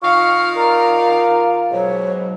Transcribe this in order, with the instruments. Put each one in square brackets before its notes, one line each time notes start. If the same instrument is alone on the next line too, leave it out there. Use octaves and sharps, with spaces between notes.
[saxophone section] D#3 D#5 F5 [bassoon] F4 [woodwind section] C#6 [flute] F6
[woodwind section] A#4 D5 [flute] A#5
[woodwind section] G#2 F#3 [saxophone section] B2 [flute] C#5